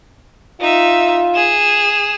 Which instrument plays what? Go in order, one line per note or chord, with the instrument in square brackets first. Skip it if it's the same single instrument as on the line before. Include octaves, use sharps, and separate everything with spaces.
[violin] D#4 E5 [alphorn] F4
[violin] G#4 E7